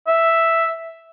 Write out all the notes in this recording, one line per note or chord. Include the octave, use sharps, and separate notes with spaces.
E5